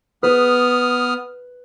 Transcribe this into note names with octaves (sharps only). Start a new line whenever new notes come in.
B3 B4 D#6 F6